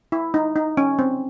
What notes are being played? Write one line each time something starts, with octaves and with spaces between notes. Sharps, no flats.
E4
D#4
D#4
C#4
C4